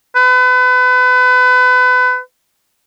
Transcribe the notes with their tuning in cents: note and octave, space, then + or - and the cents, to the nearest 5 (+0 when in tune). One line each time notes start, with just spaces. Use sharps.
B4 +30